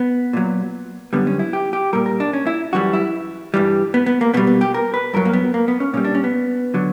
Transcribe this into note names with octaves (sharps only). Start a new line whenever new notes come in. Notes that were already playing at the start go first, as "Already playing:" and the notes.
Already playing: B3
A#2 F#3
F#2 D3 G3 B3
C#4
E4
G4
G4
A#2 G3 A#4
A#4
D4
C#4
E4
F#2 E3 G3 F#4
E4
G2 E3 G3
B3
B3
A#3
B2 G3 B3
B3
G4
A#4
B4
G2 F#3 A#4
A#3
B3
A#3
B3
C#4
A#2 G3 C#4
D4
C#4
B3
D3 F#3